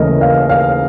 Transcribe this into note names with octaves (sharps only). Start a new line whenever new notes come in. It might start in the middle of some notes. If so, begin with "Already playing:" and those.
Already playing: D#2 C#3 E3 A3 A#4 D#5
F5
F5